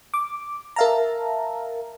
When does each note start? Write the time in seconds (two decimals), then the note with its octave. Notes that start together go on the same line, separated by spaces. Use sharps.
0.14 D6
0.76 A#4 E5 F5 A5 A#5